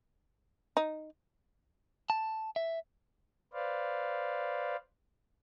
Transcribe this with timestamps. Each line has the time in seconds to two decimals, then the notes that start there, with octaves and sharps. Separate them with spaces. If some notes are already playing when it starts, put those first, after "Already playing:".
0.77 D#4
2.10 A5
2.56 E5
3.53 B4 C5 D5 F5